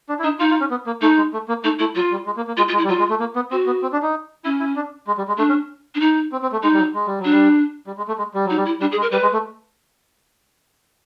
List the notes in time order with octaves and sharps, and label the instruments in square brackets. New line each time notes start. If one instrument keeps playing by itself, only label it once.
[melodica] D4
E4
[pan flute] D4 [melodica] D#4
[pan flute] D#4 [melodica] F4
[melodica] F4
C#4
B3
A#3
[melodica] A3 [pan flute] D#4
[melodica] G#3
A3
A#3
[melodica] A3 [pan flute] D#4
[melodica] A3 [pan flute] E4
[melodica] F#3 [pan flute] F4
[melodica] G3
G#3
A#3
A#3
[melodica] G#3 [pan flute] F4
[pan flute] F4
[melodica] G#3
[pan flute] E4
[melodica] G3
[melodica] F#3 [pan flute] F4
[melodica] G#3
A3
A#3
B3
[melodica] C4 [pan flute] F#4
[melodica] B3
C4
D4
D#4
[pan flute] C#4 [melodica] E4
[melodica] E4
D4
G#3
G3
G#3
[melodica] A3 [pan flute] D4
[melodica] C#4
[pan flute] D4
D#4
[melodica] C4
C4
A3
[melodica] G#3 [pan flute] D#4
[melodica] G3
F#3
G#3
G3
F#3
[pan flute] D4
[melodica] G3
G3
G#3
A3
G#3
G3
[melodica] F#3 [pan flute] D#4
[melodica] G3
[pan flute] E4
[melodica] G3 [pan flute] D4
[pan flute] G#4
[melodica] G#3
[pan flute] A#4
[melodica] G3 [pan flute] B4
[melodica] G#3
A3